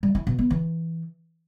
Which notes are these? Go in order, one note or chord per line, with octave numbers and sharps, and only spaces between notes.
G3
E4
B2
B3
E3